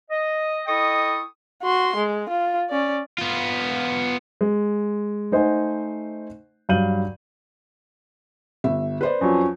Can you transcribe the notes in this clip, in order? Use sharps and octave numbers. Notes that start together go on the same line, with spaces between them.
D#5
E4 A4 D#5 G5 C#6 D#6
F#4 C6
G#3
F4
C#4 D5
B3 F4
G#3
A3 D#4 C5 D#5 F#5 G#5
G2 F#3 F5 G6 D#7 F#7
G1 E5
B4 C5 D5
F2 F3 F#3 C#4